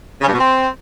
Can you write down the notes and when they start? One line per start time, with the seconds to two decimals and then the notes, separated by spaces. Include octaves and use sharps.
0.21 C#3
0.27 G2
0.32 B2
0.38 C4